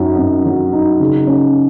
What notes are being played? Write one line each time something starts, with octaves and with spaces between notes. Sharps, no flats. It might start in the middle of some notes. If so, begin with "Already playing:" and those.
Already playing: F#2 F#3 D#4
F#2
F#3
D#4
C#3
C#4